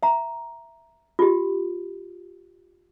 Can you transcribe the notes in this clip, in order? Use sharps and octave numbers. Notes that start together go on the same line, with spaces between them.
E5 A#5
F4 G4